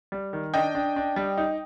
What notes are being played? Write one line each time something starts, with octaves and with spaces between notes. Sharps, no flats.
G3
D#3
D4 D#5 G5
D4
D4
G3
D#4